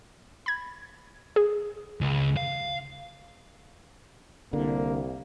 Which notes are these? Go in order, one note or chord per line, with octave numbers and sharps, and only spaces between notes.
B5 G#6
G#4
C#2
F5
C2 D3 A#3